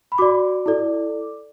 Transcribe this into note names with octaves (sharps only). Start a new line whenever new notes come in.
B5
F#4 D5 D6
E4 A4 D5